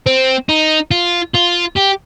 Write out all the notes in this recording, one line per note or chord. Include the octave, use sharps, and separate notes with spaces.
C4
D#4
F4
F4
G4